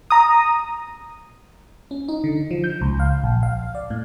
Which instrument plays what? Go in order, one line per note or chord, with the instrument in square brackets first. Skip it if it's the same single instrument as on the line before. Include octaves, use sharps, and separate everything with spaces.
[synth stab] A#5 D#6
[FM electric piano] C#4
D#4
D3
F3
G6
C#2
F5
A#1
F5
D5
A2